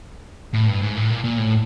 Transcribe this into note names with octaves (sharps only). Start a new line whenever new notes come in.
A2
G2
G#2
A2
A#2
A#2
A2